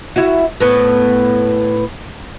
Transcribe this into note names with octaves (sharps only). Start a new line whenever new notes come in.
E4 F#4
A2 B3